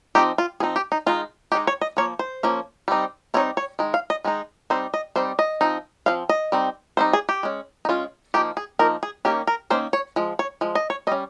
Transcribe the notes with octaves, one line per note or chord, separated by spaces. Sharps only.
F3 C4 D#4 G4
F4
F3 C4 D#4 G#4
G4
D#4
D#3 G#3 D#4 F4
D#3 G#3 D#4 G4
C#5
D#5
F3 A#3 C#5
C5
F3 A#3 C#4
G3 C4 D#4
G3 C4 D#4 C#5
C#5
D#3 G#3
F5
D#5
D#3 G#3 D#4
G3 C4 D#4 C5
D#5
G3 C4 D#4 C5
D#5
F3 C4 D#4
F3 C4 F5
D#5
G3 C4 D#4
G3 C4 D#4 C5
G#4
G4
G#3 C#4
D#4
G#3 C#4 F4
F3 A#3 D#4 G4
G#4
F3 A#3 D#4 A#4
G#4
D#3 A#3 C#4 G4
A#4
D#3 A#3 C#4 C5
C#5
F3 G#3
C#5
F3 G#3
D#5
C#5
G3 C#4 D#5